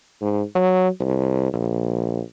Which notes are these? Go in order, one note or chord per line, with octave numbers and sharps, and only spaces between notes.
G#2
F#3
C2
A#1